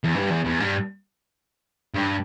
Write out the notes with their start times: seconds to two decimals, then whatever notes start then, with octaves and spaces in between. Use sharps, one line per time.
0.04 E2
0.15 G2
0.31 E2
0.45 E2
0.60 G2
1.94 G2